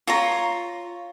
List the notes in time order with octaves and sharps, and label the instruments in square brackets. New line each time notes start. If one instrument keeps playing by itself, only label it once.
[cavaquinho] F4 C#5 A#5